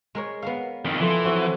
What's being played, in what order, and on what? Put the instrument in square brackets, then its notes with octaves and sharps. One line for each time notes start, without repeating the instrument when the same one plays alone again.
[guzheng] G#3 A#4 C#5
B3 A#4 F5
[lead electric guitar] F2 D#3 [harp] E6
[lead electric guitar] E3 [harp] F3 A4 C6
[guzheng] F#3 C4 F#4